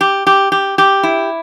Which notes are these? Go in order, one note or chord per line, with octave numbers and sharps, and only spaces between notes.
G4
G4
G4
G4
E4